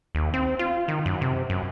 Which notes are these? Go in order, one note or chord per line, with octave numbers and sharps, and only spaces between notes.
D#2
C4
F4
D#3
F#2
C3
F#2